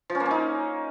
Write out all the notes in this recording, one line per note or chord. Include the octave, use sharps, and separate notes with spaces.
F3
C#4
A#3
C#4
D#4